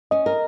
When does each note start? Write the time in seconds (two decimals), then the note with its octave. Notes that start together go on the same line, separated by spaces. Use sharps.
0.11 C#4 D#5
0.26 A#4